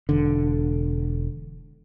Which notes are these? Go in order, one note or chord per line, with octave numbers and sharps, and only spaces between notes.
E1 D3